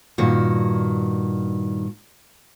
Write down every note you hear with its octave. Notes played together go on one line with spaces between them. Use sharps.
G2 A#2 D#3 F#4